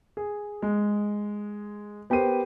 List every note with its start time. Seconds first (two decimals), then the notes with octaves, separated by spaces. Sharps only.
0.17 G#4
0.62 G#3
2.10 B3 G4 A#4 C5 D#7